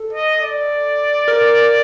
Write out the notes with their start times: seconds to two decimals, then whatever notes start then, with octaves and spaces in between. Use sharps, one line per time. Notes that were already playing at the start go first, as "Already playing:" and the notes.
Already playing: A4
0.13 D#5
0.42 D5
1.28 A#4